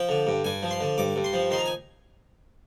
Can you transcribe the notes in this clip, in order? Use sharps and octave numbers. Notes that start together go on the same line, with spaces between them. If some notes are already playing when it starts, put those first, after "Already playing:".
Already playing: F3 G5
D3
G2
G2 G#5
F3
C6
D3
G2 D6
G2
C6
F3
D#3 C6
A#5
G#5